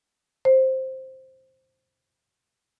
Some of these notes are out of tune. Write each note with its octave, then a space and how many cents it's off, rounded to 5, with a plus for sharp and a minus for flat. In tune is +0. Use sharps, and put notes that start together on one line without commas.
C5 +5